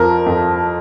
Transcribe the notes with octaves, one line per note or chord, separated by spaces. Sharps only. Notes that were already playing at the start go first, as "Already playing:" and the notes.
Already playing: F2 F3 A#4
F2 F3